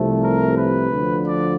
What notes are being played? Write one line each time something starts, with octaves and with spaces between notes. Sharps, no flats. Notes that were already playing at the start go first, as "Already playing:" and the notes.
Already playing: C2 C3 F3 A3
A#4
B4
D2 D3 F3
D5